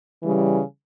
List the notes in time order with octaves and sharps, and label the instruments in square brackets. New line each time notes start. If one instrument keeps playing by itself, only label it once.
[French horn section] C#3 E3 G3